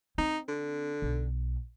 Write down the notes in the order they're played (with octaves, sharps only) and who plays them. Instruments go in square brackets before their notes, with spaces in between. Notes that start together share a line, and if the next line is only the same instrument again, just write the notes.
[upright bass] C4 [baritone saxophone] D#4
[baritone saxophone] D3
[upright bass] B1